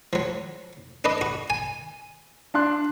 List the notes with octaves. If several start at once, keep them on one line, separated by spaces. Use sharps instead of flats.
F3 F#3
D4 B4 D#5
F#4
G#5
D4 C6 F#6